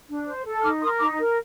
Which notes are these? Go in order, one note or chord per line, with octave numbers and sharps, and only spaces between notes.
D4
C5
A4
D#4 D6 F6
A#4 C6 D#6
D#4 A#5 D6
A#4